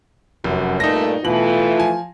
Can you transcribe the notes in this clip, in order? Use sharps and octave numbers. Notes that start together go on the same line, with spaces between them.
F1 F#2
G2 A#2 A3 D#4 A#6
B2 E3 A3 F4 F#7
F3 G#5